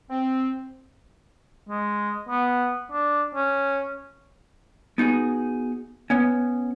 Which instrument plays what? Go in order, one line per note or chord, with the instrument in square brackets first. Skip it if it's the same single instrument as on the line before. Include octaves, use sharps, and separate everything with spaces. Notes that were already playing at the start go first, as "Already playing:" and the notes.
[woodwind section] C4
[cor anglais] G#3
B3
D4
C#4
[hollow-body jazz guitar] B3 D#4 F#4 G#4
B3 C#4